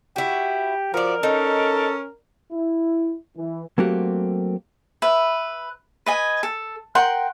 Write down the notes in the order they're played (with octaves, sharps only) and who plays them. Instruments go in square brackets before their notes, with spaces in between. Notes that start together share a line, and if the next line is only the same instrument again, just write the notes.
[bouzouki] E4 F#4 [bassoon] G4
[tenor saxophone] F3 [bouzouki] F#4 D5 [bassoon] A#4
[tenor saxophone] C#4 [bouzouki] D#4 [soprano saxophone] A4
[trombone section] E4
E3
[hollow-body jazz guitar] F#3 A3 A#3 C4 F#4 G4
[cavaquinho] B4 E5
B4 D#5 G#5
A4
A#4 F#5 G5 C6